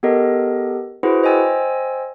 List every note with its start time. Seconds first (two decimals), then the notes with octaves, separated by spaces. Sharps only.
0.03 B3 G4 A4 A#4 D#5
1.03 E4 F#4 G#4 B4 C5 F#5
1.23 C5 D#5 G5 G#5 E6 A6